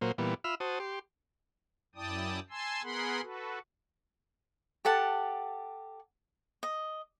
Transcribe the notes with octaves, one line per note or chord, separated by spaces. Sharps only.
A#2 F#3 A#3 C5
A#2 E3 G3 B3
F4 E5 B5 E6 F6
F#4 C5 A5 D#6
G4 C6
F#2 E4 D5 G5 A5 D#6
G#5 A5 C6 E6
B3 G#4 A#4 F#5 B5 C6
F#4 A4 B4
G4 A4 F#5 A5
D#5